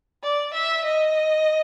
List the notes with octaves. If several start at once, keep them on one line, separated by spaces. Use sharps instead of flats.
D5
E5
D#5